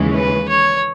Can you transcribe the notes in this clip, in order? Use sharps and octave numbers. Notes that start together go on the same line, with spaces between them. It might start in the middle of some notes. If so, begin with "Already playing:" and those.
Already playing: D#2 C#3 E3 G#3 C#4
B4
C#5